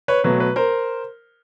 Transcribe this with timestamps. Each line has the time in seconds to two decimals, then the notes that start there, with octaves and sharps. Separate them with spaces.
0.08 B4 C#5
0.24 B2 F#3 A3 B4
0.40 B4
0.56 A#4 C5